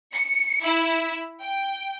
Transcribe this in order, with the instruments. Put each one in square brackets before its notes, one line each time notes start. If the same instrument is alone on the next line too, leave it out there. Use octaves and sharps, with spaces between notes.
[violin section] C#7
E4
G5